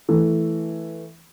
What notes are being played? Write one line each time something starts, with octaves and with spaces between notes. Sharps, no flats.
E3 A3